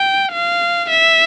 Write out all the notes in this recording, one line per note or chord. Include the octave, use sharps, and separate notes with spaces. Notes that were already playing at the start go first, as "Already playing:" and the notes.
Already playing: G5
F5
E5